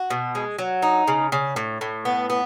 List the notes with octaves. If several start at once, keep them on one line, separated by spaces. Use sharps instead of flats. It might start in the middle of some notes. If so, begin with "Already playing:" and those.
Already playing: F#4
B2
G#3
F#3
D#4
C#3
C#3
A2
A2
B3
B3